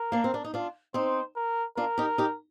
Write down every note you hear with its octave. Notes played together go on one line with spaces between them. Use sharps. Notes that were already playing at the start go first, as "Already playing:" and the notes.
Already playing: A#4
A#3 D4
C4
D4
D#4
D4 F4
C4 D#4 C5
A#4
D4 F4 A#4
D#4 G4
D#4 G4